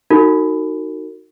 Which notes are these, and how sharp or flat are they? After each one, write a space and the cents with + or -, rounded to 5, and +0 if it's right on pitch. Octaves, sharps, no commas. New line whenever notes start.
D#4 +0 F#4 +0 A#4 -40